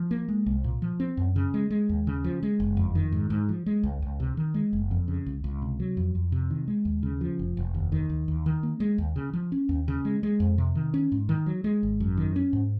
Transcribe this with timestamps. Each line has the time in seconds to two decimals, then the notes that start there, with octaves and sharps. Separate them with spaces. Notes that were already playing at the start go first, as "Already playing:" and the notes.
Already playing: F3
0.11 A#3
0.29 G#3
0.46 C2
0.64 A#2
0.82 F3
1.00 C4
1.17 F#2
1.36 C#3
1.54 G#3
1.70 G#3
1.89 D#2
2.07 C#3
2.24 F3
2.43 G#3
2.60 F#1
2.77 F2
2.95 D#3
3.12 G#2
3.30 G#2
3.49 F3
3.66 G#3
3.83 C#2
4.02 C#2
4.20 C3
4.37 D#3
4.54 G#3
4.73 F#1
4.91 F2
5.08 C#3
5.26 C#2
5.44 C#2
5.62 C3
5.80 F#3
5.97 F2
6.15 F2
6.32 C3
6.50 D#3
6.68 G#3
6.85 D#2
7.03 C#3
7.21 F3
7.39 F1
7.57 F1
7.75 D#2
7.92 D#3
8.10 D#2
8.28 D#2
8.46 D#3
8.63 A#3
8.80 G#3
8.98 D#2
9.16 C#3
9.33 F3
9.52 C#4
9.69 D#2
9.88 C#3
10.05 G#3
10.23 G#3
10.40 F2
10.58 C3
10.75 D#3
10.94 C#4
11.12 G#2
11.29 D#3
11.46 F#3
11.64 G#3
11.83 G#1
12.00 F#2
12.17 D#3
12.36 C#4
12.53 G#2